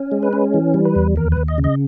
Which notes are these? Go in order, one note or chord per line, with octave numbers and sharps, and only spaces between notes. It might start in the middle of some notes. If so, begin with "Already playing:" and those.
Already playing: C#4
G#3
B4
C#4
E3
G3
B4
E2
D#2 A#4
B4
D#2
D#5
C#3
D#5